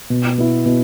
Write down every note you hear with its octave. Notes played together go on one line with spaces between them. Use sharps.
B2
B3 E4
B2